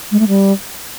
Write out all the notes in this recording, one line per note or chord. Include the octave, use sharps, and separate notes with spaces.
G#3
A3
G3